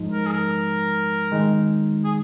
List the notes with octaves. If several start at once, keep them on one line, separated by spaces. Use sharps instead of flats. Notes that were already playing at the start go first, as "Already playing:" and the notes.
Already playing: G#2 F3 G#3 D#4
A#4
G#4
A#4
D#3 G#3 D#4
G#4